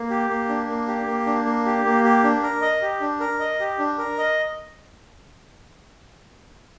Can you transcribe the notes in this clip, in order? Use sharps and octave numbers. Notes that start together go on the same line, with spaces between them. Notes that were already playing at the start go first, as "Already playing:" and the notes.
Already playing: A#3
G4
A#3
D4
A#3
G4
A#3
D4
A#3
G4
A#3
G4
D4
A#4
D#5
G4
D4
A#4
D#5
G4
D4
A#4
D#5